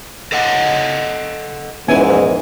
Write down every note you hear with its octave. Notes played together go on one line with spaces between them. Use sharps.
A4 D#5 F#5
A#1 E2 G#2 E3 B3 C#4 G#5